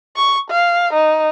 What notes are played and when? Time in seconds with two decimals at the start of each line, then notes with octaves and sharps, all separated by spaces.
0.16 C#6
0.50 F5
0.93 D#4